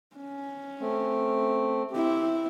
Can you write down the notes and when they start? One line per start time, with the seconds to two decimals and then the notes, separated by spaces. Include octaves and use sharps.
0.16 C#4
0.80 A3 C4
1.91 C4 E4 G4